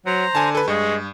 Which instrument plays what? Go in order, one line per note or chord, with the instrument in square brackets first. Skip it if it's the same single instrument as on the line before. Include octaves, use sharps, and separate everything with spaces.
[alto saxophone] F#3 [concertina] C5 A#5
[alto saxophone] D3 [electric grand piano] G#5 A5
[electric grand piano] A4 B4 [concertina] G#5
[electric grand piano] G2 [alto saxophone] G#3 [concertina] C#6